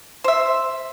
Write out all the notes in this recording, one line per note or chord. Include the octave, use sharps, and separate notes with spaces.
C5 E5